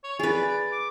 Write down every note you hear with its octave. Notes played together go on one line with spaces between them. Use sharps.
C#5
G#4 B4 D5
D6